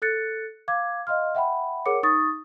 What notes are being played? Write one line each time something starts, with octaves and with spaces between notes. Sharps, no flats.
A4 F#6 A6 C#7
F5 D6 G#6
D#5 F5 C6 F6
E5 F#5 G5 B5
G#4 A#4 C#5 F#5 D6 C#7
D#4 C#6 D#6 A6